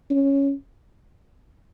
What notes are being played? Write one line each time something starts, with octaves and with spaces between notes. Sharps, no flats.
C#4